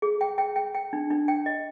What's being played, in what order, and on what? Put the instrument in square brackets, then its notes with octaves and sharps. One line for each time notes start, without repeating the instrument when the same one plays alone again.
[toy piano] G#4
G5
G5
G5
G5
D4
D4
G5
D#5